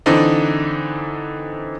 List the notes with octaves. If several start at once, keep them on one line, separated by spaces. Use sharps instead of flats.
D3 E3 C4 D4 D#4